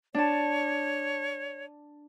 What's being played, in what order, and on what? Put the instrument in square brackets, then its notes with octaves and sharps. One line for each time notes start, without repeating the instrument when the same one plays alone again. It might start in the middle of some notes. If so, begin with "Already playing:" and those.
[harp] D4 A5 [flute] C#5